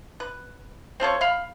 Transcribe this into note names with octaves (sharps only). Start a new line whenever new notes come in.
B4
C4 F4 A4 C#5
F5 B5